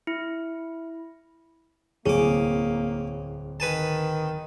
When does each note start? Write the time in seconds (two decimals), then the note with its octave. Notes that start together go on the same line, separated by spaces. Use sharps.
0.07 E4
2.06 D1 C2 A#3 C#4 G#4 D6
3.60 D#3 B4 G#5 A5